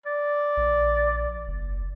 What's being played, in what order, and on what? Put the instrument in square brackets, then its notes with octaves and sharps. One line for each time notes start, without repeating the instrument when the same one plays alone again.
[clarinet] D5
[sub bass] A#1
F#1